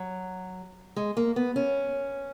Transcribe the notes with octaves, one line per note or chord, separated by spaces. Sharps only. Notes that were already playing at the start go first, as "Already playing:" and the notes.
Already playing: F#3
G#3
A#3
B3
C#4